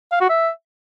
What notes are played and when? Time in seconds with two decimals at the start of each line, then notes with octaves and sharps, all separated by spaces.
0.12 F5
0.21 F#4
0.29 E5